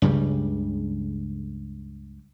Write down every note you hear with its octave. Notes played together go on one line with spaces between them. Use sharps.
C#2 G2 C#3 G3